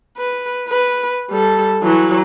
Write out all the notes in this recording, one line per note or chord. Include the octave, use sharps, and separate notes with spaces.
B4
B4
G3 A4
E3 F#3